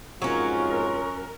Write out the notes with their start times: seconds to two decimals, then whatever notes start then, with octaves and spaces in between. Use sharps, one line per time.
0.22 F2 G#2 F#3 C#4 F4 A#4 C#6